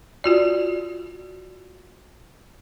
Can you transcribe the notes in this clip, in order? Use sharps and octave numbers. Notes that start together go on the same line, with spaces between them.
F4 F#4 D5